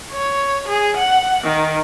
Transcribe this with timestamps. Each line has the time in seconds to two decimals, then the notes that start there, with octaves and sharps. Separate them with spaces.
0.12 C#5
0.68 G#4
0.97 F#5
1.44 D#3